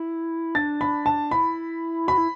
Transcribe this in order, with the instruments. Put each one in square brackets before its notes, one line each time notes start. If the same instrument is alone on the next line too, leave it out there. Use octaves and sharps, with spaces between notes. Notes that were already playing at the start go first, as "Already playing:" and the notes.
Already playing: [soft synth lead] E4
[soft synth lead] D4 [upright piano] A6
[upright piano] B5
A5
[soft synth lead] E4 [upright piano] B5
[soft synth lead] F#4 [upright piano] B5
[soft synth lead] E4